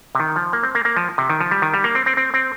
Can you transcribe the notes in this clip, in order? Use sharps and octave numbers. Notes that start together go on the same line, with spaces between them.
C3
D#3
F3
A#3
C4
A#3
A#3
F3
C3
D#3
F3
G3
D#3
G3
A#3
C4
C4
C4
C4